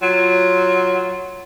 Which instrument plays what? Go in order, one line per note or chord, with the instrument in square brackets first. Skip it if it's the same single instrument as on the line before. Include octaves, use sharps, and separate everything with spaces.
[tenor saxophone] F#3 [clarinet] F4